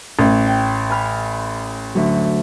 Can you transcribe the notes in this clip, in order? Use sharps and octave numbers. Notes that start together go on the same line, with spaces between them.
A1
G5
G#5 B5 F6
D2 F#3